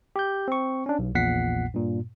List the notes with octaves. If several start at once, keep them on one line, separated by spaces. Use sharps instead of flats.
G4 G6
C4 C#6
C#4 D4
B1
A#1 E2 A#2 F#5 B6 C7
G2 A#2